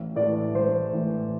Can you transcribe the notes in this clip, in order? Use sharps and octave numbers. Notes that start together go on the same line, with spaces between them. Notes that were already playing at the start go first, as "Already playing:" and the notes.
Already playing: A1
A2 E3 D5
A1 C5
A2 E3